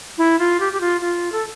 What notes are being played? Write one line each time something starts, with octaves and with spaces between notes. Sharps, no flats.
E4
F4
G4
G4
F4
F4
A4